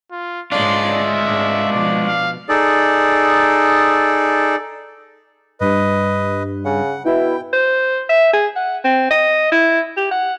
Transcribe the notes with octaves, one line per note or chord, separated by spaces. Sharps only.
F4
G#2 G#3 D4 F4 C#5 D5 C6
E5
G#2 D4
B2 F3 D5
F5
D#4 G#4 A4 D5
G2 B4 D#5
C#3 F#5
B2 E4 G5
C5
E5
G#4
F#5
C4
D#5
E4
G4
F#5